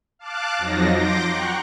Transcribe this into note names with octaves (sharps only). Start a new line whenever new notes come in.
F5 A5 D6 F#6
F2 F3 F#3 D#4 A#6
C6 D6 G6 A#6 D7
F#5 G5 A#5 C#6 F#6